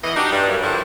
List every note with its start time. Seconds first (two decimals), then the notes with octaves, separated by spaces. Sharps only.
0.04 E2 E3 B3 D#5
0.16 D4 D#4 F#4 G4
0.32 G2
0.49 F#2
0.62 G2 D3 F3 G3 E4